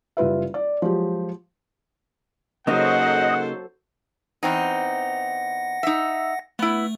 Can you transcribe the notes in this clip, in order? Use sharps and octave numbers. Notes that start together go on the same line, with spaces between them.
F#1 G3 F4 B4 E5
D5
F3 F#3 G#3 G4
C#3 F#3 A#3 D#4 A4 C5 D#5 F#5
E2 C4 D#4 F#5 A#6
D#4 E5
A3 B3 E4